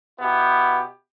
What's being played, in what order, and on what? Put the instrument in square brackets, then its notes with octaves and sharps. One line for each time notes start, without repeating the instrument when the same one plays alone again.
[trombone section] B2 B3 E4 G4